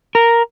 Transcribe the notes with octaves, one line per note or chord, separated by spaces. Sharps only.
A#4